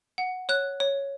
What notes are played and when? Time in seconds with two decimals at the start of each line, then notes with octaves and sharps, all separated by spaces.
0.18 F#5
0.49 C#5 F#6
0.80 C#5